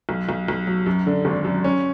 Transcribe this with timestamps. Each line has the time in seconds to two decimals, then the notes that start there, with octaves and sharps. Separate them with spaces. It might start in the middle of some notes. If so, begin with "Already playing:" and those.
0.09 B1
0.29 B1
0.48 B1
0.67 F#3
0.86 F#2
1.07 D3
1.25 G#1
1.44 F#2
1.64 C#4